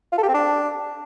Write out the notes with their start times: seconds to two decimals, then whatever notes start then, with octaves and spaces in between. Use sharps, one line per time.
0.12 F4
0.18 A4
0.23 G4
0.29 C4
0.34 D4